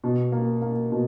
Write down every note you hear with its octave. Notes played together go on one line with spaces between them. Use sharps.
B2
A#3
A#3
B2